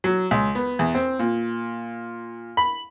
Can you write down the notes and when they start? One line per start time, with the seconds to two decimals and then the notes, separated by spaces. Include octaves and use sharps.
0.04 F#3
0.31 C#2
0.55 B3
0.79 E2
0.95 C4
1.19 A#2
2.57 B5